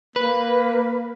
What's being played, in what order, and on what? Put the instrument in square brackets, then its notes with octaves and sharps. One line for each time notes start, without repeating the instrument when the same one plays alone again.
[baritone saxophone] A#3 [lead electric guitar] B4